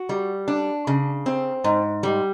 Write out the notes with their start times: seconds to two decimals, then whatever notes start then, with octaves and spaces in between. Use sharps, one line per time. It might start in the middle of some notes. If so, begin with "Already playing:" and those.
Already playing: F#4
0.09 G3
0.48 D4
0.87 C#3
1.26 C4
1.64 G#2
2.03 G3